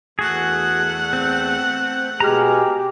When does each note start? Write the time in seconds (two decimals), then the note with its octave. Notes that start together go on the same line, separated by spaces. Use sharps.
0.19 E2 A3 F#4 G#4 F#5
1.13 C4
2.20 B2 G#3 G4 G#4 A#5 F6